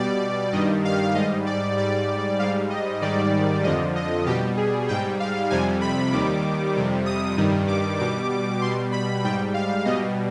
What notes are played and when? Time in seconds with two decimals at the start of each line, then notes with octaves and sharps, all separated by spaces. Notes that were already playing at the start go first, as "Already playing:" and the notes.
Already playing: B2 G3 D5
0.53 G2 D#3 G3 D#5
0.85 F5
1.15 G#2 D#5
1.19 G3
1.46 D5
1.77 G#2 G3 D5
2.39 G#2 G3 F5
2.70 D#5
3.01 G#2 D#3 G3 D5
3.64 F2 D3 F3 D#5
3.96 D#5
4.26 B2 G3 G4
4.57 G#4
4.88 G#2 G3 G5
5.20 F5
5.50 F2 C3 G3 G#5
5.81 B5
6.12 D#2 D#3 G3 D6
6.74 F2 C3 G3
7.06 D#6
7.38 G2 D#3 G3
7.68 D6
7.99 B2 G3 D6
8.61 B2 G3 C6
8.92 B5
9.24 G#2 G3 G5
9.54 F5
9.85 B2 G3 D#5